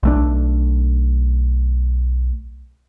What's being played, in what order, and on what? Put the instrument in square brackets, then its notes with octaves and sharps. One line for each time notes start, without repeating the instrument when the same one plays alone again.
[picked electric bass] B1 A3 D4